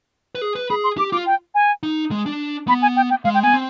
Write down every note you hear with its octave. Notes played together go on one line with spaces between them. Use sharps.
B4
G#4
B4
G#4 B5
C6
G4 D6
F4 D6
G5
G#5
D#4
G#3
D4
B3 B5
G#5
G5
G5
G#3 F5
G5
B3 G#5
C4